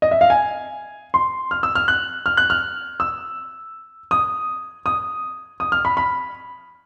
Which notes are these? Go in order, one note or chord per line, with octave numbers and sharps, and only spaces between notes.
D#5
E5
F5
G#5
C6
F6
E6
F6
F#6
F6
F#6
F6
E6
D#6
D#6
D#6
F6
B5
B5